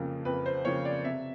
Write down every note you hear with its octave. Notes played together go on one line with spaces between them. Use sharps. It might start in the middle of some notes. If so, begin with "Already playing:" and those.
Already playing: F2 C#3 F3 A#3
F2 B4
C5
C#3 F3 A#3 C#5
D5
C3 E5